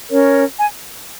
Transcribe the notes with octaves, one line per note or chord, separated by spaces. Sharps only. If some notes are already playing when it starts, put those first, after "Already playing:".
C#4 A#4 C#5
G#5